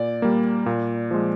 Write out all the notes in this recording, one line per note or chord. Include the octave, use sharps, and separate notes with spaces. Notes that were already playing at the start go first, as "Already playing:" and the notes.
Already playing: A#2 D5
G3 A#3
A#2
F3 G#3